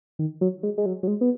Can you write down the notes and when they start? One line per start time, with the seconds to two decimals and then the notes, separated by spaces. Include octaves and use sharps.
0.19 D#3
0.41 F#3
0.63 G#3
0.78 G#3
0.86 F#3
1.03 F#3
1.08 G#3
1.21 B3